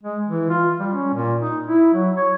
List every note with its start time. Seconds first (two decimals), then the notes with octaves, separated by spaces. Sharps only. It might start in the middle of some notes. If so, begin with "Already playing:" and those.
0.03 G#3
0.27 E3
0.50 F4
0.80 G3
0.94 C#4
1.14 A#2
1.41 D#4
1.67 E4
1.94 F#3
2.17 C#5